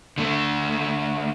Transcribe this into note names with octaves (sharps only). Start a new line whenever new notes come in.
D3 A3